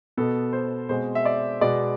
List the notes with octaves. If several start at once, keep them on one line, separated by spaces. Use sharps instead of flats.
B2 B3 A4
C5
B2 G#3 C4 C5
E5
D5
B2 G#3 B3 D5